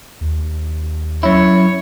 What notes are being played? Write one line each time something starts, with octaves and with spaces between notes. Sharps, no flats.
D#2
F#2 E4 C#5